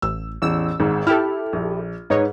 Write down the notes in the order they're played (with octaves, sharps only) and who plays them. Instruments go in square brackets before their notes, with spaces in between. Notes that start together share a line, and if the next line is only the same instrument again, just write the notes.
[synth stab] A1 [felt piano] E6
[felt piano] A1 E2 [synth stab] E6
[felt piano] G#1 G#2
[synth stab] E4 G4 A4 [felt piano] F6
[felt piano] A#1
[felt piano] G#2 B4 [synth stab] D#4 C#5